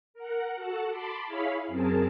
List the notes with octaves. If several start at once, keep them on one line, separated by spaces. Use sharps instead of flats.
A#4 F#5
F#4 A4 F#5 A5
A5 B5 C6 D6
E4 G#4 C#5 F5 B5 B6
F#2 C4 G#4 A#4 A5